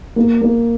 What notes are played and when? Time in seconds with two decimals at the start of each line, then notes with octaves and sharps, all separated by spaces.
0.16 A#3
0.41 A#3